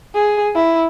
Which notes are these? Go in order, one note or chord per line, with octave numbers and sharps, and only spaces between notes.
G#4
E4